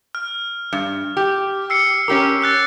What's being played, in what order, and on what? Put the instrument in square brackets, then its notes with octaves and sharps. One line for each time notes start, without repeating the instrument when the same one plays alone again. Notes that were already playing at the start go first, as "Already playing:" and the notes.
[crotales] F6
[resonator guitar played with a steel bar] G2
G4
[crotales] E6 C7 C#7
[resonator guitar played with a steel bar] C#4 G4 A#4 [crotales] D6
[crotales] E6 F#6 A6